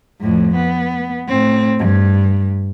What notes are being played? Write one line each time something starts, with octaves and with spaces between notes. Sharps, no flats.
F2 A2
B3
A2 C4
G2